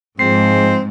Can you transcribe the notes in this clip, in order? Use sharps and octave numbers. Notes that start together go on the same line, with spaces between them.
G#2 F3 G#3 C4 C7